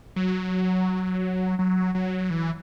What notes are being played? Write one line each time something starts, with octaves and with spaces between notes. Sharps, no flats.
F#3
F#3
F#3
E3